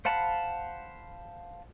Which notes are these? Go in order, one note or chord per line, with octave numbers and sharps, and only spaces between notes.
C5 F5 F#5 A5 B5